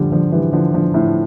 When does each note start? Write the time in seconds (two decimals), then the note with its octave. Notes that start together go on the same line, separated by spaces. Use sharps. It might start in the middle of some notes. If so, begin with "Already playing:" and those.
Already playing: D3 F3 G3
0.12 D3 F3
0.32 E3 G3
0.53 D3 F3
0.74 D3 F3
0.94 A2